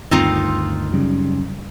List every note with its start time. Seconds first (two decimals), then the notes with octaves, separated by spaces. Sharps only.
0.11 D2 G2 D#3 C4 D#4 F4
0.93 F#2 C#3 G3